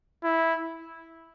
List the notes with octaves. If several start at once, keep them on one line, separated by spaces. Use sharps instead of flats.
E4